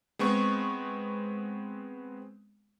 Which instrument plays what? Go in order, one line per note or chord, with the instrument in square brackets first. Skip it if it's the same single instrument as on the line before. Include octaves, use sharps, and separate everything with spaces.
[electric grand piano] G#3 B3 C4 C#6